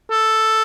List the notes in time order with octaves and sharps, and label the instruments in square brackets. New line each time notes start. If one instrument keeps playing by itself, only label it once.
[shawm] A4